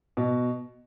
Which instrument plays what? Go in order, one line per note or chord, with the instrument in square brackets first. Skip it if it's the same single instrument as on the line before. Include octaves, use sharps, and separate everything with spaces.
[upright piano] B2